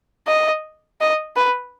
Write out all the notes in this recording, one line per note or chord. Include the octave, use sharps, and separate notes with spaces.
D#5
D#5
B4